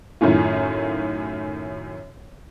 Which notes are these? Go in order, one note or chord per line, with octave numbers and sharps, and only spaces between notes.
F#2 A2 D#3 C#4 F4